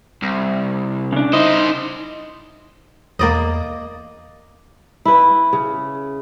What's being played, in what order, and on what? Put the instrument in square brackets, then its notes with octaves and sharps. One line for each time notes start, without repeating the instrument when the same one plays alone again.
[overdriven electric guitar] C2
[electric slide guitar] C#3 D4
[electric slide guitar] D#4 D#5 [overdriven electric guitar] E4 C5
[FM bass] E2 [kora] A#3 D5 D#5
[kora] E4 B4
C#3